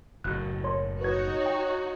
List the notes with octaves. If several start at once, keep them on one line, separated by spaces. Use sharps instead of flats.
F#1 A2 F#6
C#5 C6
D#4 F#4 B4 C#5 G#6
G5